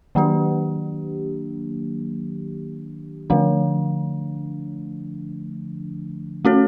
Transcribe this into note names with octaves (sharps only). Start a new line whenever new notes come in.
D#3 F#3 A#3 D4 G4
D3 F3 A3 D4
A3 C#4 F#4 A4 C#5